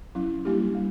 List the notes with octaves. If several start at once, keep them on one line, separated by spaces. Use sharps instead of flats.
F#3 C#4 E4
G3 A#3 D4 E4 G4
G3